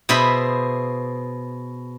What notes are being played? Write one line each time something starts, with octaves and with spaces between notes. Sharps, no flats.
B2 G#4 C5 E5 B5